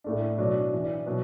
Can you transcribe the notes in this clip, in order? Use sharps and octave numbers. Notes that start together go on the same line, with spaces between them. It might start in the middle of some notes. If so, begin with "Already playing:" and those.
A2 A3 D4
B2 F#3 D4
E3 D4
B2 F#3